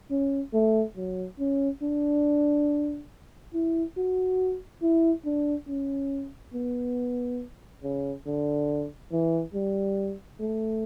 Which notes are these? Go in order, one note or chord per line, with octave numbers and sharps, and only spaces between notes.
C#4
A3
F#3
C#4
D4
E4
F#4
E4
D4
C#4
B3
C#3
D3
E3
G3
A3